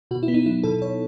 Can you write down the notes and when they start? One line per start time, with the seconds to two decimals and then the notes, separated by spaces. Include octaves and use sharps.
0.11 B2 F#4
0.23 E4
0.28 B3
0.34 D#4
0.46 F#3 E4
0.63 B2 A4
0.81 B2 C#5